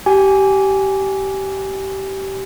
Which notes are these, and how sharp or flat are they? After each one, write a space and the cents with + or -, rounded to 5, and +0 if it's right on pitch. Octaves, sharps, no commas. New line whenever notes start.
G4 -20 G#5 +0